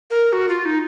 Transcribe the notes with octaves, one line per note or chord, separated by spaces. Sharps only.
A#4
F#4
F4
D#4